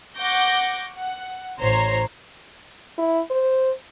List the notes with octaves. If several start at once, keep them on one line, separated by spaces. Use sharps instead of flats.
F#5 C#6 D6 G6 A#6
F#5
A1 C5 C#5 A#5 C7
E4
C5